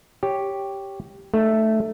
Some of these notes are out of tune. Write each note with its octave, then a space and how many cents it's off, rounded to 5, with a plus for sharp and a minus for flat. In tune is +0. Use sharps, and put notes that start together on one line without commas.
G4 +0 C#5 +0
A3 +0 D#4 -35